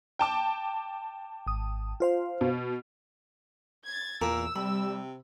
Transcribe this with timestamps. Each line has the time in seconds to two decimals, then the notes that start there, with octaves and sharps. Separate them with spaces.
0.19 G5 A5 D6
1.47 G#1 D#6
2.00 F4 C5 F5
2.41 B2
3.85 G#6 A6
4.21 E2 A#2 A#4 E6
4.55 C3 G3 B5